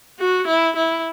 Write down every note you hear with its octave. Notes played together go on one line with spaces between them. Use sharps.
F#4
E4
E4